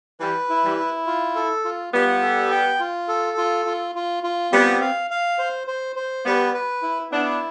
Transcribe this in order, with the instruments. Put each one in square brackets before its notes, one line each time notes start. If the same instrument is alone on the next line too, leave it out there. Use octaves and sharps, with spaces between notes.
[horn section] E3 G3 [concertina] B4
[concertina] E4
[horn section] E3 G3
[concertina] E4
F4
A4
F4
[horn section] G3 B3 [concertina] F4
[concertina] A4
G5
F4
A4
F4
F4
F4
F4
[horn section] G3 B3 [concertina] C4
[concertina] F5
F5
C5
C5
C5
[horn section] G3 B3 [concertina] B4
[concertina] B4
E4
[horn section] B3 D4 [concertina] E4